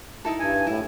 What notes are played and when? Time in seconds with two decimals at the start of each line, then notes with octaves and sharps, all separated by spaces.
0.25 D#4 E4 A4
0.40 G2 G#5
0.67 A2 E4